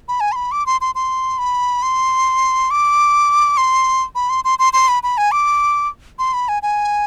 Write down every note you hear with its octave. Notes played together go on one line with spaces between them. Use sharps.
B5
G#5
C6
B5
D6
C6
C6
C6
B5
C6
D6
C6
B5
C6
C6
C6
C6
B5
B5
G#5
D6
C6
B5
G#5
G#5